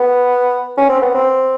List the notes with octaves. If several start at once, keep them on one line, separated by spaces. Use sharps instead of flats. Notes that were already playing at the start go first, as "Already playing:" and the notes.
Already playing: B3
C#4
C4
B3
C4